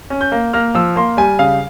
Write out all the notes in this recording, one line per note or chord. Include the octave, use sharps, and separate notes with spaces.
C#4
G6
A#3
A#3 F6
F3 E6
A#3 C6
G3 G#5
C#3 F5